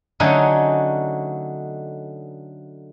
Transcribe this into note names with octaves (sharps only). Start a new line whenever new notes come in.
D3 F#3 A3 C#4 D#4 G#4